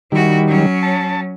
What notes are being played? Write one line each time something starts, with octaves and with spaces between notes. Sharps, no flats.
D#3 G3 E4 F#4
F#3 C#4
A5